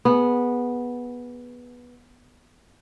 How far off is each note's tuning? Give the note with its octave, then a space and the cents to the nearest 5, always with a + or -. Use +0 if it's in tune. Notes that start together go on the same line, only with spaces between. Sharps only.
B3 -10 G#4 +0